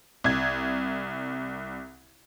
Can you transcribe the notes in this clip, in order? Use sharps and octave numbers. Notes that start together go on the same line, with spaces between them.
C2 G#6